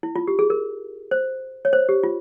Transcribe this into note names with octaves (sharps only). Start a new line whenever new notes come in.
E4
F4
G4
G#4
A#4
C5
C#5
C5
G4
F4